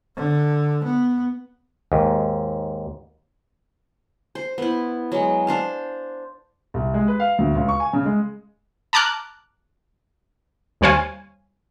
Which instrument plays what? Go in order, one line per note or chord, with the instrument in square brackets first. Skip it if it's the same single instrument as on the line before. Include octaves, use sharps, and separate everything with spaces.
[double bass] D3
B3
[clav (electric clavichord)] D#2 G#2
[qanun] C5
B3 E4
F#3 G#3
D4 C5 F5
[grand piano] C2
G#3
B4
F5
D2
C#2
C#6
G#5
C#3
G#3
[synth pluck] A5 A#5 D6 F6 F#6
D#2 G3 C5 C#5 F5 G#5